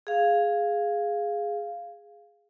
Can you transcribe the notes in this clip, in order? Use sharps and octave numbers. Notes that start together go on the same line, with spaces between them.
G#4 F5